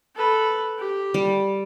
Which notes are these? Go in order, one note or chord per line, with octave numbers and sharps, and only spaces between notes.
A4 B4
G4
G3